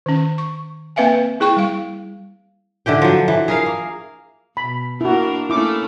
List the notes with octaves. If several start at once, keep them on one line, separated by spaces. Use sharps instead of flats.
D#3 C#4
C#6
A#3 C4 B4 E5 F5 G#5
E4 G#4 G5 C#6
G3 F5
D3 E3 G4 G5
F3 F#3
E3
G#4 A#4 F5
A#3
B2 B5
A#3 D4 E4 F#4 A#4
A3 A#3 C#4 E4 D6